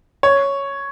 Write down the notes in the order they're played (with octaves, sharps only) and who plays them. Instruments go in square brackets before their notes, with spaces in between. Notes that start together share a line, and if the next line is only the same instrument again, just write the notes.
[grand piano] C#5